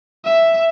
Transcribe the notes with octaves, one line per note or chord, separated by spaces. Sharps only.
E5